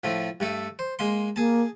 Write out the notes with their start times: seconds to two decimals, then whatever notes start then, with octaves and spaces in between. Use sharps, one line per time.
0.04 A2 F3 A3
0.40 G2 A3 A4
0.79 C5
0.99 G#3 A#3 C6
1.36 A#3 G#4 A5